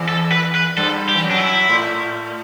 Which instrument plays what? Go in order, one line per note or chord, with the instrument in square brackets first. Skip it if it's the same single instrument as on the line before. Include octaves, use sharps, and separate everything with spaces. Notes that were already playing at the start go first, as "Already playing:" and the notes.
Already playing: [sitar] E2 E3
[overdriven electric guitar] A4
B4
B4
[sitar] G2 G3 [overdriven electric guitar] A4
[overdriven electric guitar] G4
[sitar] E3
F#2 F#3
[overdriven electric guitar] D4
E4
[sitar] A2 A3